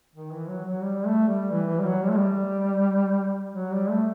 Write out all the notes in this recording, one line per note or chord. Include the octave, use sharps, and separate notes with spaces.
D#3
E3
F#3
F#3
G3
A3
G3
E3
E3
G3
F#3
G3
A3
G3
F#3
G3
A3